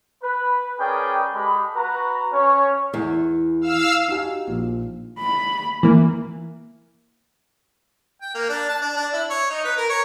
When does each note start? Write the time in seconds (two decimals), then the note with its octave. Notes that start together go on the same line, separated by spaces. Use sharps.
0.22 B4
0.78 C#4 G#4 A#4 B4 D5 G5
1.34 G#3 G4 A4 B5
1.75 F#4 B4 A#5
2.32 C#4 C#5
2.94 E2
3.61 F5 E6
4.08 D#4 F#4 G4 F5 G#5
4.47 A#1 A#2
5.19 B5
5.83 E3 A#3
8.22 G5
8.34 A#3
8.49 D4
8.68 A5
8.81 D4
8.97 D4
9.13 E4
9.30 C#5
9.50 D#4
9.64 B4
9.77 A#4
9.90 C#5